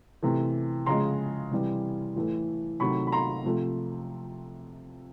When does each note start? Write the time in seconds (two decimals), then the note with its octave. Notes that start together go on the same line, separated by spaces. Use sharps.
0.23 C3 E3 A3
0.86 C#3 F3 G#3 A#5 C6
1.51 C3 E3 G3
2.16 A2 E3 A3
2.80 C3 D#3 F#3 A3 B5 C#6
3.07 B5
3.12 A#5 C6
3.45 C3 F3 A3